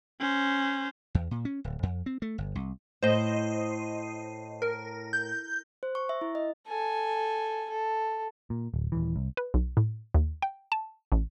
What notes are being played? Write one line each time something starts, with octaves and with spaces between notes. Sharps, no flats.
C#4 C5
E2
A#2
C#4
D1
F2
C4
A3
G1
C2
A2 C5 D#5
A#4
G6
C5
C#6
E5
E4
D#5
A4 G#5
A4
A#2
D1
D#1 E3
C2
B4
B1
A2
D#2
G5
A5
A1